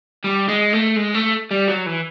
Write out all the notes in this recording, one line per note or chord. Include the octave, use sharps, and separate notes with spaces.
G3
G#3
A3
G#3
A3
G3
F#3
E3